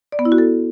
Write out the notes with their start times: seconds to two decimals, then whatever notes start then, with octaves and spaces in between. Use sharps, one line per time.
0.12 D5
0.19 B3
0.25 E4
0.32 F#4
0.38 A4